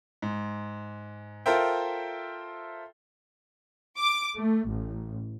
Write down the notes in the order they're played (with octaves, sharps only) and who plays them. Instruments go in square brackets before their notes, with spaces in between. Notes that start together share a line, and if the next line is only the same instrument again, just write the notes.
[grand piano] G#2
F4 A4 A#4 C5 E5 G5
[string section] D6
A3
A1